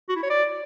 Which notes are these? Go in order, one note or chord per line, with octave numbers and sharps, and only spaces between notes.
F#4
E4
C#5
D5